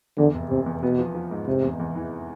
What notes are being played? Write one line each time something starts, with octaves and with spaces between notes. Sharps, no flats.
E2 D3
F1
F1 C3
E2
B2 B3
F3
F3
G#2
F1 C3
E2
E2
E3